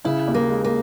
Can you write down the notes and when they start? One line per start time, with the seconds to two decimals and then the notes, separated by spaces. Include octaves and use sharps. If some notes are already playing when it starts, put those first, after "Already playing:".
0.05 C#3 E4
0.28 D#2
0.34 A#3
0.50 G#3
0.64 A#3